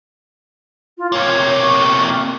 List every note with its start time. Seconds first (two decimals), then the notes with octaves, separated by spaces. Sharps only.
0.98 F4
1.12 C3 A#3 C#5
1.59 C#6